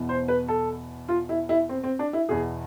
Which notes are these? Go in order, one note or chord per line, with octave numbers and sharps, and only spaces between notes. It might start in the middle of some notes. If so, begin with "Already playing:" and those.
Already playing: E2 B2
C5
B4
A4
F4
E4
E4
C4
C4
D4
E4
E2 B2 G#4